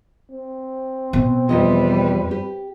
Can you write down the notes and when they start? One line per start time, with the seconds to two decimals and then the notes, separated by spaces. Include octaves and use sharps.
0.31 C4
1.13 B2
1.49 E2 F3 G3 B4 D#5
2.31 G4